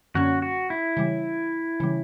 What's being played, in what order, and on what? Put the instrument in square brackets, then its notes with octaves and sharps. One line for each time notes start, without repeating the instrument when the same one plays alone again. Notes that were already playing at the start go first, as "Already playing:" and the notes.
[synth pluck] F#2 D3 F#3 A#3 C#4 [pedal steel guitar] F#4
[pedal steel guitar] F#4
E4
[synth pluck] C#3 E3 G3
C#3 E3 G3